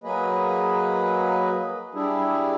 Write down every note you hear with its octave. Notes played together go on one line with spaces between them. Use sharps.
F#3 A#3 G#4 B4 D#5
G3 D4 E4 G#4